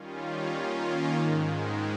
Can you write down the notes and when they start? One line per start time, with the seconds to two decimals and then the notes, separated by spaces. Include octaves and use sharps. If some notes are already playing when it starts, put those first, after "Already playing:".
Already playing: D#3 G3 C#4 F4
0.53 D#3 A#3 C#4 F4
1.15 G#2 D#3 G#3